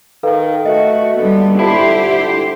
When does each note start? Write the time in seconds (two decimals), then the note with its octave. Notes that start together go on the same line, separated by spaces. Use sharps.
0.23 D#3 A4 B4 F5
0.66 A3 F#4 D#5
1.18 D3 G3 B3
1.59 E4 F4 G4 A4 C5 A5